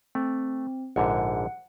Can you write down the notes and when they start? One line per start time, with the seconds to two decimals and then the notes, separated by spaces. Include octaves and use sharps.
0.15 A3 C4
0.96 A#1 G#2 D3 F#5